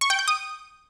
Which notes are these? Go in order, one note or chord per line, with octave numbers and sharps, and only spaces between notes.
C#6
G5
G6
D#6